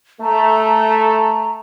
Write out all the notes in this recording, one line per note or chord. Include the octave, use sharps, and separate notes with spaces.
A3 A#5